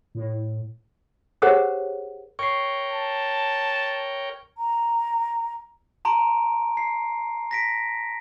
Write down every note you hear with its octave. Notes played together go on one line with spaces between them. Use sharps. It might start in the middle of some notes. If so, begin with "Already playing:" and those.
A2
G4 G#4 A#4 C5 C#5 F#5
A#4 C#5 G5 C#6 C7
A5
A#5
A5 A#5 C6 D7
C7
A#6 B6 D7